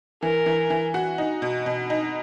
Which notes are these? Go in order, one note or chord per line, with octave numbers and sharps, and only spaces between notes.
E3 A#4
E3
E3
F#4
D#4
B2
B2
D#4